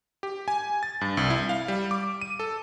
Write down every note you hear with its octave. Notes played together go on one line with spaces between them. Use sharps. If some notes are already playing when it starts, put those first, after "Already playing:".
G4
G#5
A6
G2
C2
E4
F5
G3
D6
D#7
A4